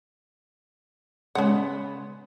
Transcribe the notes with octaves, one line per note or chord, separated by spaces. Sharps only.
C#3 G#3 B3 C#4 F#5